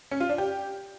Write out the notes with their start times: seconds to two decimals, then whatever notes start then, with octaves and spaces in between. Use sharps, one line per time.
0.11 C#4
0.20 F4
0.29 D4
0.38 G4